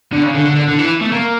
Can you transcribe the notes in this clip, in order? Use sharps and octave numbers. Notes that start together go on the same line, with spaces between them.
D3
C#3
D3
D3
D3
D3
E3
A3
A#3